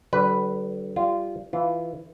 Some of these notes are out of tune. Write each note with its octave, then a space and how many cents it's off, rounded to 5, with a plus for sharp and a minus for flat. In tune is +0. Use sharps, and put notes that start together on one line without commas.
D3 +0 G3 -45 B4 +0
G3 +0 F4 -20
E3 +0 F4 -10